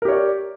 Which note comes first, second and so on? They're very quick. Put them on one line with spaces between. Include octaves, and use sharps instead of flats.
A#4 G4 C#5 D5